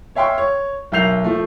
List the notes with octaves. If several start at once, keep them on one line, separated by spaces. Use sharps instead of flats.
C#5 E5 F5 G5 C6 C#6
C#5
B1 A#4 E5 G6 C7 F7
F3 A3